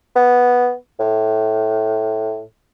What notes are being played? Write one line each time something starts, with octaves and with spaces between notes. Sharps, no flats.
B3
A2